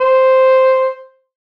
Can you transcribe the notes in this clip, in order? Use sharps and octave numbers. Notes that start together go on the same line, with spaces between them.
C5